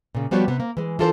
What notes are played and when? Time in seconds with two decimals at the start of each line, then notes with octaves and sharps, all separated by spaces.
0.15 A#2 C#3
0.31 F3 G3 B3 F#4 G4 C#5
0.48 C3 B3
0.60 A#3
0.77 E3 G#3
0.99 E3 D4 F4 A4 A#4 C5